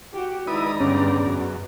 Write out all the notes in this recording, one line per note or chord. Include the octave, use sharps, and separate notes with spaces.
F#4 G4
D#3 G#3 E4 B4 D5 A#5 D#6
G2 D3 B3 C#4 G#4
F#2